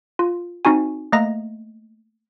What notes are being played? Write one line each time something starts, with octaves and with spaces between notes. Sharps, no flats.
F4
C4 D#4 F#4 G#5
A3 A#3 D#5 A#5 A#6